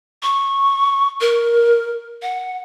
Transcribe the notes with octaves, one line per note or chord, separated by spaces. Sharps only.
C#6
A#4
F#5